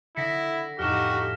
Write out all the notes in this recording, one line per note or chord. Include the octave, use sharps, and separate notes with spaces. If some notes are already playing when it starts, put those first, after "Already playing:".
D3 E4 F#5 D#6 A#6 B6 C#7
F2 A2 D#4 F#4 G4 F6 E7